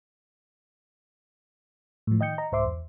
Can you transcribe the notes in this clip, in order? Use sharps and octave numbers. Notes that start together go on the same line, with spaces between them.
A2 F3
D#3 D#5 G5 G6 C#7
D#5 A#5
C2 G#2 C5 E5 C6 D6
E2